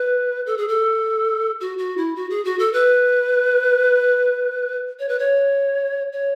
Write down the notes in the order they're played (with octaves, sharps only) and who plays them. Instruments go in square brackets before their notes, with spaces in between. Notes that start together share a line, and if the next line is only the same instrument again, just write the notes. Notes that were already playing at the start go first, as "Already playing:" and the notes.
Already playing: [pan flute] B4
A4
G#4
A4
F#4
F#4
E4
F#4
G#4
F#4
A4
B4
C#5
B4
C#5
C#5